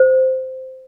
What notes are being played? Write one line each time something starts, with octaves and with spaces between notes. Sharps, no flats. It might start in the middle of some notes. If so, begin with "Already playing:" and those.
Already playing: C5